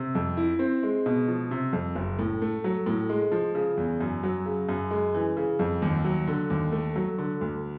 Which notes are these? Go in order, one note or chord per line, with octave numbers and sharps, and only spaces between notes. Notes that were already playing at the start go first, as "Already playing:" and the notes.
Already playing: C3
F2
E4
C4
G#3
B2
F3
C3
F2
F#1
A2
A3
F#3
A2
G#3
F3
C#3
E2
F#2
F#3
C#3
F#2
G#3
E3
C#3
F2
D#2
F#3
D3
D#2
A3
F#3
D3
D2